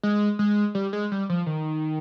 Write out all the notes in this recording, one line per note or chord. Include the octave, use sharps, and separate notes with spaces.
G#3
G#3
G3
G#3
G3
F3
D#3